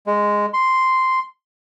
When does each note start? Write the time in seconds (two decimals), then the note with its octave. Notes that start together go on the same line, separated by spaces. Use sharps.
0.07 G#3
0.54 C6